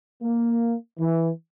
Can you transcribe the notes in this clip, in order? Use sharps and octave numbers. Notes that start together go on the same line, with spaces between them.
A#3
E3